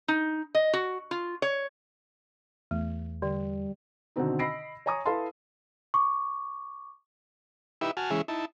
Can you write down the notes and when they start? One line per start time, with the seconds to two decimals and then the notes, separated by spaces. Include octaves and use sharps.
0.08 D#4
0.55 D#5
0.73 F#4
1.11 F4
1.42 C#5
2.71 E2 A3
3.22 D3 G3
4.16 B2 D3 D#3 C4 D#4
4.39 D#5 B5 E6 A#6 C7 D7
4.86 C#5 G#5 A#5 C#6 D#6
5.06 E4 A4 B4 F5 A5 C6
5.94 C#6 D6
7.81 D#4 E4 G4 B4 E5
7.97 F#4 G#5 A5 F6
8.11 E3 G#3 C#4 G#4 E5
8.28 D#4 E4 A5